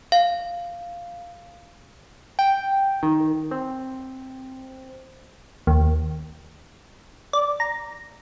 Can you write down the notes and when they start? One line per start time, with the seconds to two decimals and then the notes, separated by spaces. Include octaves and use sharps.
0.12 F5
2.39 G5
3.03 D#3
3.51 C4
5.67 D#2
7.33 D5
7.60 A#5